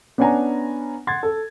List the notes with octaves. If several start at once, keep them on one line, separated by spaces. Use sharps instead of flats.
B3 C#4 D4 F#5 G#5 A#5
F#5 C6 G#6 A6
A4